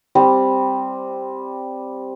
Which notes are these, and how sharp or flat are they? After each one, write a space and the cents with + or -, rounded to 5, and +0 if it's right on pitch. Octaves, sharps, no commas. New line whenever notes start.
G3 +0 C4 +0